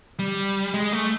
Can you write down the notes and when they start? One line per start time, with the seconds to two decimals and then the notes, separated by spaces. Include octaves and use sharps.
0.19 G3
0.74 G#3
0.93 A3